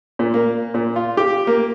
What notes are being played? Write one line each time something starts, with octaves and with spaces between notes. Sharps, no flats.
A#2
A#3
A#2
F4
G4
A#3